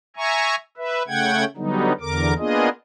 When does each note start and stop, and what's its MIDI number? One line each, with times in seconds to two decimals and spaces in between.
0.16 0.55 76
0.16 0.55 80
0.16 0.55 82
0.16 0.55 85
0.77 1.03 71
0.77 1.03 76
1.08 1.44 49
1.08 1.44 57
1.08 1.44 78
1.08 1.44 79
1.08 1.44 92
1.57 1.92 50
1.57 1.92 54
1.57 1.92 55
1.57 1.92 59
1.57 1.92 63
2.00 2.33 40
2.00 2.33 50
2.00 2.33 70
2.00 2.33 86
2.38 2.69 58
2.38 2.69 59
2.38 2.69 62
2.38 2.69 65
2.38 2.69 68
2.38 2.69 75